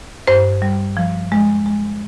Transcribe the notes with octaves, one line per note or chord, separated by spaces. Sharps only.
G2 C5
G3
F3
G#3
G#3